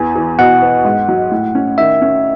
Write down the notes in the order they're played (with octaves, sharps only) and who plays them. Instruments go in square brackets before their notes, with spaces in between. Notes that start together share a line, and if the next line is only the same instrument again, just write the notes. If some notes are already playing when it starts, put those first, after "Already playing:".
Already playing: [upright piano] E2 B3 [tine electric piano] G#5
[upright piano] E3
[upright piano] B2 [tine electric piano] F#5
[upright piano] B3
G#2
F#3
A2
C#4
[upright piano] D#3 [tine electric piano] E5
[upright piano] C#4